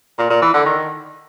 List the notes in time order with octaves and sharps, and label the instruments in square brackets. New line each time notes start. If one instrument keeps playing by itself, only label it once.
[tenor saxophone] A#2
A#2
E3
D3
D#3